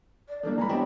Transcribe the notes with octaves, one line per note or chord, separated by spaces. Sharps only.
D5
D#3 E3 G3 A#3 D4 A4
E3 G#3 B3 G#5 A#5 B5
B3 C4 D4 E4 G4 C#5 D#5